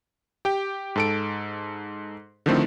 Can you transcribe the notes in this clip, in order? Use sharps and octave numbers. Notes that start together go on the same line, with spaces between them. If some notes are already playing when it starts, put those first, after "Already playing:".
G4 G5
G#2 A4 D7
D3 D#3 F3 A3 C4 E4